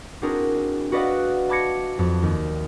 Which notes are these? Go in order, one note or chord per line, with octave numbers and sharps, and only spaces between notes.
C4 D4 E4 F#4 G#4 A#4
F#4 B4 D5 D#5 F5 F#5
A5 B5 D6 G#6 A#6 C#7
F2
D#2